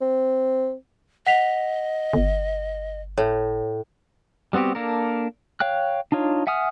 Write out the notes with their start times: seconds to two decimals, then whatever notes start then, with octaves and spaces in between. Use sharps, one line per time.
0.01 C4
1.27 D#5 F#5 B6 F7
2.13 G1
3.18 A2 C#5
4.53 G3 B3 C4 F#4 G4
4.75 A#3 D4 A4 A#4
5.60 C#5 F5 G5 F#6
6.12 D4 D#4 F4 C#5
6.47 E5 F#5 G#5 D#6 F6